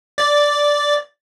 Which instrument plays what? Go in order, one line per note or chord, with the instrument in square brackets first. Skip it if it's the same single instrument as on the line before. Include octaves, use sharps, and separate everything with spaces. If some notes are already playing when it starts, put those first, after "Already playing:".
[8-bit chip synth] D5 A6